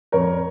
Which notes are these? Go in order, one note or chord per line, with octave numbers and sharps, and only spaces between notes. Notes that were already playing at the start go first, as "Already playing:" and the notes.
F2 A#4 C#5